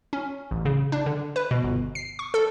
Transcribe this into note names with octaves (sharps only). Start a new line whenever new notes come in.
C#4
A1
C#3
D4
D3
B4
B2
G1
C7
C#6
A4